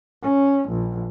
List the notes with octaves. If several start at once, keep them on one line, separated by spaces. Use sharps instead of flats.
C#4
A#1